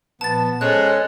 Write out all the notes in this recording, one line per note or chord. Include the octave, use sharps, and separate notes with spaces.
A#2 F3 B3 A5 A6
G#3 C#4 A4 C5 C#5 D#5 F#6